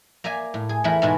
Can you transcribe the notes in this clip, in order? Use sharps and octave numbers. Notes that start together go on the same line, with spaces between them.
A#3 D5 E5 G#5
A2
G#4
E2 E3 A3 E4 A#4 B5
G#2 B2 G#3 B3 E4 A5